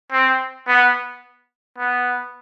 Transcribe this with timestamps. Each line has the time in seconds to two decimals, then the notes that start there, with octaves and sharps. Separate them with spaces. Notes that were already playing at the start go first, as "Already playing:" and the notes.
0.12 C4
0.67 B3
1.78 B3